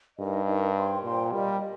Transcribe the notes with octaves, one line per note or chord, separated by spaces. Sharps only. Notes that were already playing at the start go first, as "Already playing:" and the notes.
G2 D#4 A#4 D#5
D#4 A#4 D#5
C5 G5 C6
A#2 C5 G5 C6
G3 F4 A#4 D#5
D#5